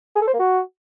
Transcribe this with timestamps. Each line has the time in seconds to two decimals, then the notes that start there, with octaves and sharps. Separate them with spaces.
0.16 G#4
0.22 A4
0.28 C5
0.33 A#3
0.39 F#4